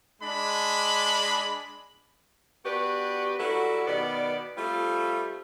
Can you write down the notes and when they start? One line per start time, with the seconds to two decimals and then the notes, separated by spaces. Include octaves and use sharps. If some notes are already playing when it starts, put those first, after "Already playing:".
0.22 G#3 D4 B5
2.65 B3 D4 F#4 G4 B4
3.39 F#3 G3 E4 F#4 A4
3.87 B2 D#3 B3 D5
4.57 G3 A3 C4 F4